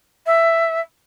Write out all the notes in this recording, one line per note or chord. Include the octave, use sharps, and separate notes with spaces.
E5